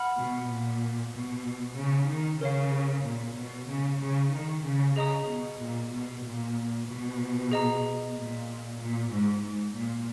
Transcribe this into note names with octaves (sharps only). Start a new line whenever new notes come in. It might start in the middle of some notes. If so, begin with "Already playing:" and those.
Already playing: F#5 B5 F6
B2
A#2
B2
C#3
D#3
C#3 A#4 C#5 F5
A#2
B2
C#3
C#3
D#3
C#3
C#3 G#4 D#5 A#5 D#6
B2
A#2
B2
A#2
B2
G#4 D#5 A#5
A#2
A#2
G#2
G#2
A#2